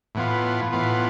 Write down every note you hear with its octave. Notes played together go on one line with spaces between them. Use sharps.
A2 E3 B3 F4
A2 E3 B3 F4